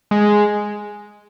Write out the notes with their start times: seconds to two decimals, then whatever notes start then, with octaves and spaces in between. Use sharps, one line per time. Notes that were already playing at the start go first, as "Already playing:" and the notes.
0.11 G#3